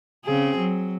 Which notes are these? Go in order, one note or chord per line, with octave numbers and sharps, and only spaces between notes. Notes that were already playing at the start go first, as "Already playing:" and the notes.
C#3 C4 G#4
F#3